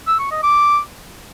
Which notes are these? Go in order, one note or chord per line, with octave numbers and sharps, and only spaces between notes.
E6
C#6
D#5
D6